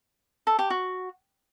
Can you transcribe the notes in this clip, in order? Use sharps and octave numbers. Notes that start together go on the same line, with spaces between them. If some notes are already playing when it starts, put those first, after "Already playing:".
A4
G4
F#4